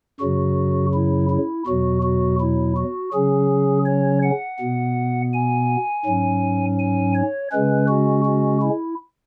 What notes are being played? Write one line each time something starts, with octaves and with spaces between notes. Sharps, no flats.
F#2 C#3 F#3 F#4
E4
E4
E2 B2 F#3 F#4
F#4
E4
F#4
C#3 F#3 C#4 G#4
C#5
F#5
B2 B3
G#5
G#2 F#3 C#4
G#5
C#5
C#3 G#3 C#4 B4
F#4
F#4
E4